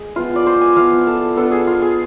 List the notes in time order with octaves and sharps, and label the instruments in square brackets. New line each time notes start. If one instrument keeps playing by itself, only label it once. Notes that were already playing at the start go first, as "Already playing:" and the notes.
Already playing: [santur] G#3 G#4
F3 B3 E4 F4
D5
C5
G#5
F3 B3 E4 F5
A4
B3 D4 F4 A4
G#4
F4
G#4